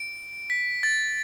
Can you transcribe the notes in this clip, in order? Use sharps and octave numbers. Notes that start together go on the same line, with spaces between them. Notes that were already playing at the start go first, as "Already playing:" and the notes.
Already playing: D7
B6
A6